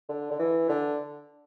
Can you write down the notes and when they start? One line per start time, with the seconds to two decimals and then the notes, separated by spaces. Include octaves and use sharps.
0.09 D3
0.31 D3
0.39 E3
0.69 D3